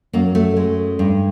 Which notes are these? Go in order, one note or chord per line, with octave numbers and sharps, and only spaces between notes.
F#2 A#3
A3
G#3
G2